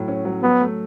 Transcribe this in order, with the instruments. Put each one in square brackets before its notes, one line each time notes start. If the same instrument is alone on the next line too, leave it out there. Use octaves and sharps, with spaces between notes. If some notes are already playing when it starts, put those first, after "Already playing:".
Already playing: [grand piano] A2 F#3
C#4
F#3
[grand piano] F#3 [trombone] B3
[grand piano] A3